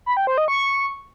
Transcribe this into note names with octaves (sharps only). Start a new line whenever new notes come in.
B5
G5
C5
D#5
C#6